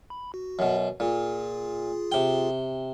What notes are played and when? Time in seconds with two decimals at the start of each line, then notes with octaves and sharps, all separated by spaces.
0.10 B5
0.34 F#4
0.59 F#2 B2
1.00 A#2 F4 G#4
2.12 C3 G5